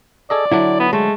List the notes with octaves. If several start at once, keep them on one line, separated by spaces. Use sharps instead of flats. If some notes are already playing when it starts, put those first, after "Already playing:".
G#4 A4 D5 D#5
D3 F#3 D4 E4
B3
G#3 A3